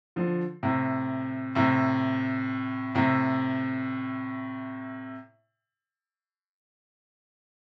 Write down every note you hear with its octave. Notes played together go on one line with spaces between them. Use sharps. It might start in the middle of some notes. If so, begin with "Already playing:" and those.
D3 F3
A2 C3
A2 C3
A2 C3